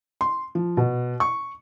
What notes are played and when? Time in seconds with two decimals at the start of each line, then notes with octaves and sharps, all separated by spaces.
0.21 C6
0.55 F3
0.77 B2
1.20 C#6